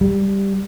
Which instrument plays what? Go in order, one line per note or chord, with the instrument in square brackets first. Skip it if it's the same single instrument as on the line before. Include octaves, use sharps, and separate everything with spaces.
[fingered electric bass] G3